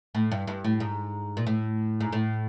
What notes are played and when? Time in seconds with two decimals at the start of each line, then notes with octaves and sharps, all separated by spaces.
0.15 A2
0.31 G2
0.47 G2
0.64 A2
0.80 G#2
1.37 A#2
1.47 A2
2.00 G#2
2.13 A2